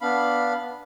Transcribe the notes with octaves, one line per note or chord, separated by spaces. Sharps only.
B3 D4 F5 B5